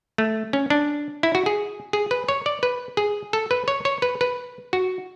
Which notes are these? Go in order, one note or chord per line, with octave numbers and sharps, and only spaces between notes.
A3
C#4
D4
E4
F#4
G#4
G#4
B4
C#5
D5
B4
G#4
A4
B4
C#5
C#5
B4
B4
F#4